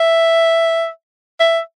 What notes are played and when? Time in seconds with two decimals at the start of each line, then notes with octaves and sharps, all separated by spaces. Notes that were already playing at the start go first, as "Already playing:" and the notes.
Already playing: E5
1.40 E5